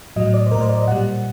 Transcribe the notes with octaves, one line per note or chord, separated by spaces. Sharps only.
A2 F#3 D#5
D5
C5
A2 F#3 A#4
C5
D5
D#5
A#2 G3 F#5